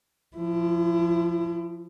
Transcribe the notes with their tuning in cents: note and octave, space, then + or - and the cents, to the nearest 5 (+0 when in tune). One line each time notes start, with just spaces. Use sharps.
F3 +0 E4 +35